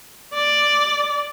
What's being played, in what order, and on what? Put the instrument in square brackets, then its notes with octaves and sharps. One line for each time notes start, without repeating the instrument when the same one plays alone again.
[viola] D5